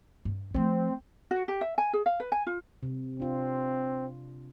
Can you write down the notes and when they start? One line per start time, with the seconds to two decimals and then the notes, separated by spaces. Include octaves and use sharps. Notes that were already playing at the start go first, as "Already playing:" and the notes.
0.25 G2
0.54 F3 A3 C4
1.31 F#4
1.48 G4
1.61 E5
1.78 G#5
1.93 G#4
2.06 F5
2.20 B4
2.32 G#5
2.47 F4
2.83 C3
3.20 C4 D4 F4